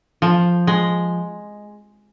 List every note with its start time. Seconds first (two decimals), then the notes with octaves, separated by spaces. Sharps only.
0.22 F3
0.67 G#3